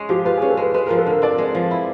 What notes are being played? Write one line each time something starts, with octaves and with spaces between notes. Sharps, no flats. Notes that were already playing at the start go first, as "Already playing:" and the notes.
Already playing: G#3 C#4
F3 G4
F4 B4
G#4
C#4
A4
G#3 B4
G#3 B4
A#4
F3
A4
D3 A#4
C4 D5
G#3
F3
E4